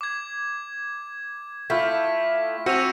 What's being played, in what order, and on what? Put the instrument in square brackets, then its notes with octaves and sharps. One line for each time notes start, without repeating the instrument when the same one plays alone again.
[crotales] D6 G#6
[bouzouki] A3 [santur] E4 F4 G5 [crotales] B6
[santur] C4 [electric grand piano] F#4 [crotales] C#7 D#7 F7